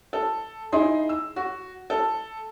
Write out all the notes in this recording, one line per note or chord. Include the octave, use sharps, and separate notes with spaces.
A4
D#4 E4 G#4 C6
E6
F#4
A4